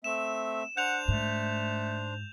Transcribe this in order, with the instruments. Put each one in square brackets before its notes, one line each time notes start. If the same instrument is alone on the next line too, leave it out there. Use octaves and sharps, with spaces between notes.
[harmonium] A3 C4 E5 [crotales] E7
[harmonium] D4 C5 [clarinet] F#5 [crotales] G6 F7
[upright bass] G#2 [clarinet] A3